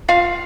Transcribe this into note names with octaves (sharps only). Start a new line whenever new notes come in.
F4 F5